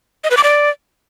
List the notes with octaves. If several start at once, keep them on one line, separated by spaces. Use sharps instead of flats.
D#5
B4
D6
D5